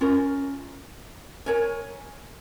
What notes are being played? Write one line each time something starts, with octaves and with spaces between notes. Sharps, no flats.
C#4 F4 A#4
A#4 C#5 G#5